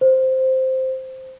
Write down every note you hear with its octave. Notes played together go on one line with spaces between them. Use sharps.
C5